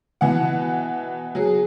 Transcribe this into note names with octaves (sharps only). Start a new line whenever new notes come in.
B2 E3 F#5
F#3 G#4